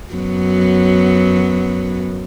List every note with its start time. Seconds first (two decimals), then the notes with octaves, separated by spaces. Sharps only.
0.13 F#2 F#3 B3